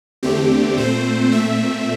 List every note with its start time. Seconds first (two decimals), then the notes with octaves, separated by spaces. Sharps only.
0.23 E2 D3 A3 C4 G4
0.78 A#2 A3 C4 C5
1.32 A#2 A3 C4 E5